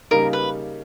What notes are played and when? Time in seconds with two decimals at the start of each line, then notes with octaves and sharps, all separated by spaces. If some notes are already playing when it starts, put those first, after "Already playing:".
0.11 C#3 G3 A#3 D#4 A#4
0.33 B4